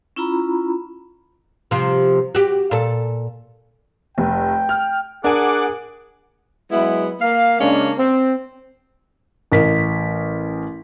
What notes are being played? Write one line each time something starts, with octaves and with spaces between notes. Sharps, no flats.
C#4 E4 F4 A#5 B5
C3 F3
F#4 G4
A#2 A4
F1 G5
F6
D4 G#4 A#4 F#5 G#5 D6 F#6
F#3 G#3 B3 E4
A#3 F5
C#3 G#3 A#3 C#4 D4
C4
A1 A#4 B6